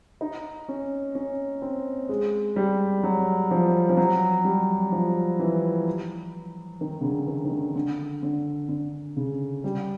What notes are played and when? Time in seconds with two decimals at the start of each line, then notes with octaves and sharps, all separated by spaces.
0.21 D#4
0.69 C#4
1.15 C#4
1.62 C4
2.09 G#3
2.56 G3
3.03 F#3
3.51 F3
3.89 F3
3.97 F#3
4.44 G3
4.92 F3
5.39 E3
6.81 D#3
7.01 C#3
7.04 D3
7.28 D#3
7.45 D#3
7.51 D3
7.76 D3
8.23 D3
8.69 D3
9.17 C#3
9.64 G3